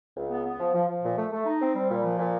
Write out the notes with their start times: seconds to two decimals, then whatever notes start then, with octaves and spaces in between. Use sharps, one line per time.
0.16 C#2
0.31 B3
0.45 B3
0.59 F3
0.74 F3
0.88 F3
1.02 A#2
1.17 A3
1.31 A3
1.46 D#4
1.60 C4
1.75 G3
1.89 A#2
2.04 F3
2.18 A#2